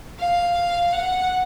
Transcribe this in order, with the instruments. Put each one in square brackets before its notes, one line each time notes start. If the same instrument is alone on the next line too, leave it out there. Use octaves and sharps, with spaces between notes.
[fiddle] F5
F#5